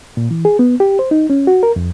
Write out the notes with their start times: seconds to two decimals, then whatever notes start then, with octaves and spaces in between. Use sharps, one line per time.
0.17 A#2
0.31 E3
0.45 G#4
0.59 B3
0.80 G4
0.99 C5
1.11 D#4
1.30 C#4
1.47 F#4
1.63 A#4
1.76 F2